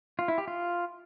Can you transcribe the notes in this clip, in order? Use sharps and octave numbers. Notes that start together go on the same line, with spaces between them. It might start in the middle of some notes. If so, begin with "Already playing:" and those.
F4
E4
G4
F4